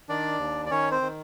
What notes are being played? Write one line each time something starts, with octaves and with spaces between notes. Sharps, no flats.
D#3 D4 D5
D#2
D5
D#3 C#4 C#5
C4 C5
D#3